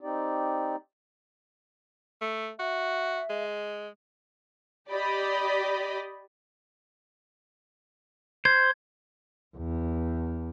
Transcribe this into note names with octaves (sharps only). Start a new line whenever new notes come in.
C4 D#4 G4 D5
A3
F#4 E5
G#3
G4 D5 D#5 B5
C5 G#6
E2